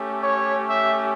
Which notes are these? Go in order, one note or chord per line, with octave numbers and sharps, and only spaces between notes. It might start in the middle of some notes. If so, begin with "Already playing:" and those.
Already playing: A3 C#4 G4
C#5
E5